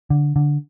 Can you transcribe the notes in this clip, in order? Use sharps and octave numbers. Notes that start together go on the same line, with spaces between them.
D3
D3